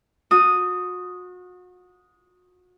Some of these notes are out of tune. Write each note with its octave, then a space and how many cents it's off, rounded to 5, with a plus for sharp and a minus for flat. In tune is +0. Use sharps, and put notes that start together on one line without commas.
F#4 -35 D#6 +0